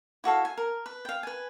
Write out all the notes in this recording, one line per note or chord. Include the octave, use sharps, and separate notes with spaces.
E4 F#4 A4 F5
G#5
A#4
B4
F5 G5
B4 G#5